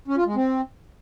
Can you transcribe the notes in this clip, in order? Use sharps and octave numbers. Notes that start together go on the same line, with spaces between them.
C#4
F4
G#3
C4